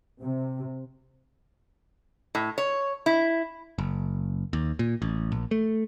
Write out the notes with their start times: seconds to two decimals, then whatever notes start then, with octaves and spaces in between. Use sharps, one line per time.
0.22 C3
2.35 A2
2.58 C#5
3.06 E4
3.78 F#1
4.53 D#2
4.79 A#2
5.02 A1
5.32 A#1
5.51 A3